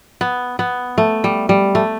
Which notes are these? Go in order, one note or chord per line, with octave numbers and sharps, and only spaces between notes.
B3
B3
A3
G3
G3
A3